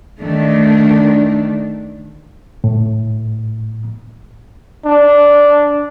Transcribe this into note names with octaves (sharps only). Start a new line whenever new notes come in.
D#3 A3 D4
A2
D4